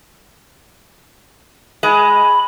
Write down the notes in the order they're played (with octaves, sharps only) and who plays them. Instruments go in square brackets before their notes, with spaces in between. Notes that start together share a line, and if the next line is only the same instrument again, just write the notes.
[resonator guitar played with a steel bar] G#3 [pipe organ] B5